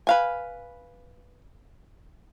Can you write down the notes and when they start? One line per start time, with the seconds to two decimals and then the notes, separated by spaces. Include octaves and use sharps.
0.07 B4 F5 G#5